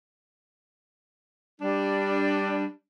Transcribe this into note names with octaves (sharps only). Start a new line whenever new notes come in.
G3 D4